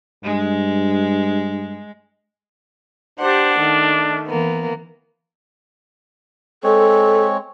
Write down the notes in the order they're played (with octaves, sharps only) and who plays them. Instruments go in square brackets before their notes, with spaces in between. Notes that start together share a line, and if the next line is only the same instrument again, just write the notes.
[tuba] G2 [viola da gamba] G#3
[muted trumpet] D4 [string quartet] G4 C5 F#5
[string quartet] D#3 A3
E3 A#3 B3
[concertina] G#3 C4 C#5 [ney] A4